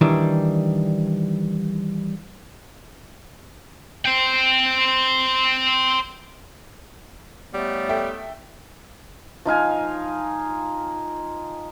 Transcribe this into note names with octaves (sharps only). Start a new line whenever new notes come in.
D#3 E3 G3 D4
C5 G5
G#2 G3 A3 B3 C#5
A4 E5 G5
F3 D#4 F5 G#5